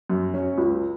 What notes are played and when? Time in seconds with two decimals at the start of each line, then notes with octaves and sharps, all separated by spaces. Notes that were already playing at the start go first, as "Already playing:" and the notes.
0.10 F#2
0.34 F#3 C#4
0.58 C#2